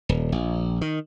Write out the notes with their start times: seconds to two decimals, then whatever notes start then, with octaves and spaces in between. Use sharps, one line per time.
0.09 D#1
0.32 A#1
0.81 D#3